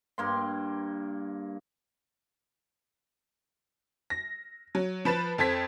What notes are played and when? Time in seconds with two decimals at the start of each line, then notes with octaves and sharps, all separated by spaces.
0.18 G2 A#3 C6
4.10 A#6
4.75 F#3
5.05 F3 B4 A6 E7
5.38 F2 A4 C5 G#6 B6